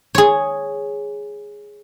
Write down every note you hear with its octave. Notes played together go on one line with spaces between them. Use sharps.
G#4 C#5